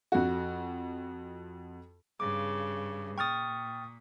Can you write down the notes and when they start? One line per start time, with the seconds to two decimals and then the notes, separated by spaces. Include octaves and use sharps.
0.12 F2 F#4
2.20 G2 C#3 D6
3.18 A#2 G5 C#6 D#6 F6 A6